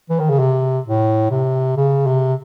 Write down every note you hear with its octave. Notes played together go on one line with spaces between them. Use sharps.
E3
D#3
C#3
C3
A2
C3
C#3
C3